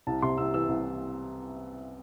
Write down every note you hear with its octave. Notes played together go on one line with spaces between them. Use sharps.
C2 A5
C3 C6
C2 E6
E3 E6
C2